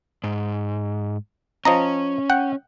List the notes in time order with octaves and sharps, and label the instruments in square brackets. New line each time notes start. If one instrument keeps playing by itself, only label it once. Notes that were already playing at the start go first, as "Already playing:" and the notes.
[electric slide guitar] G#2
[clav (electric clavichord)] F3 D#5 A#5 [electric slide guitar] C#4
[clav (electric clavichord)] F#5 G5